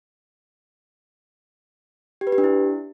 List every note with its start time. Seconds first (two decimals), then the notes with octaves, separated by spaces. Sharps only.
2.21 G4
2.27 B4
2.32 G4
2.38 D4
2.44 E4